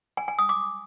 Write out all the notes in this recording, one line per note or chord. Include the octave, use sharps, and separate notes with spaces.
G#5
G#5
D#6
D6